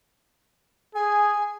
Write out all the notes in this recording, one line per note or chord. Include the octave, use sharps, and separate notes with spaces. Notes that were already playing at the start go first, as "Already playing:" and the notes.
G#4 G#5